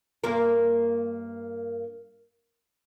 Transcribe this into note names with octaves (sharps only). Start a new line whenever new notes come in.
G2 A#3 A#4